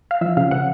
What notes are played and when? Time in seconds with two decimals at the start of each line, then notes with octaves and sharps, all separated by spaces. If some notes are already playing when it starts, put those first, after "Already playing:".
0.11 F5
0.21 F3 E5
0.37 C#3 F5
0.51 C#3 F#5